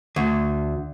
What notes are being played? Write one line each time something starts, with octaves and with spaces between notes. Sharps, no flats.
D2